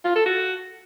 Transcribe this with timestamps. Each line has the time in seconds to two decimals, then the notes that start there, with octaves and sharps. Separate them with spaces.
0.04 F4
0.15 A4
0.26 F#4